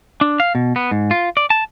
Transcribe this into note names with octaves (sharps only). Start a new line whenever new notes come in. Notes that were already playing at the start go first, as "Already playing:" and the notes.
D4
F5
B2
B3
G#2
F4
D5
A5